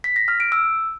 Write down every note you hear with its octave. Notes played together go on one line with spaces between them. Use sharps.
B6
A#6
F6
D7
E6